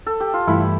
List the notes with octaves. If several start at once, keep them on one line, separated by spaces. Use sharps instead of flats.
A4
G4
F4
G2 E3 A3 E4